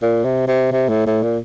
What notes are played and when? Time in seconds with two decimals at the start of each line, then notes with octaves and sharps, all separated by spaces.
0.02 A#2
0.25 C3
0.48 C3
0.72 C3
0.89 A2
1.06 A2
1.23 A#2